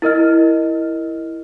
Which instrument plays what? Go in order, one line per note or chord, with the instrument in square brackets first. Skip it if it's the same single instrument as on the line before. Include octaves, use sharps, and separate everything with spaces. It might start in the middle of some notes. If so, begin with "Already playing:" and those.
[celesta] E4 A#4 D#5 F6